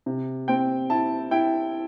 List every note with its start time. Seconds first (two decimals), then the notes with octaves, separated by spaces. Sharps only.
0.06 C3
0.48 C4 G5
0.90 E4 A5
1.31 E4 G5